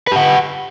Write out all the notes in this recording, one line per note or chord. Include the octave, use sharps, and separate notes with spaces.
G4 B4 F#5